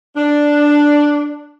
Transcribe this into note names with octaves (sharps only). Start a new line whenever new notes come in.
D4